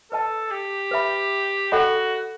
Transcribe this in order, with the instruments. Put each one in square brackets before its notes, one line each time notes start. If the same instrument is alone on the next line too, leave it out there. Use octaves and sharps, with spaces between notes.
[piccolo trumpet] A4 [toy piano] B4 D#5 A5
[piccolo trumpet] G4
[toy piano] B4 E5 B5
[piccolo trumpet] F#4 [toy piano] A4 D#5 F#5 B5